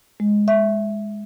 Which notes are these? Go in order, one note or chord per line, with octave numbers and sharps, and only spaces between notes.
G#3
E5